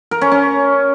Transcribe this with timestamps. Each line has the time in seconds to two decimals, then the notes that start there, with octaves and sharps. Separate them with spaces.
0.11 A#4
0.21 C#4
0.32 C#4